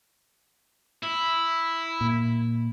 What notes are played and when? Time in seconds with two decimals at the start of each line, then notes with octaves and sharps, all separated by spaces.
1.03 E4
2.01 A#2